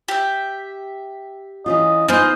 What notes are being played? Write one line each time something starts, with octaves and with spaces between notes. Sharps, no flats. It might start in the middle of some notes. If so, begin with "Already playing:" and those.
G4 E5
E3 C#4 F4 D#5
B3 D#4 F4 C5 D#5 G#5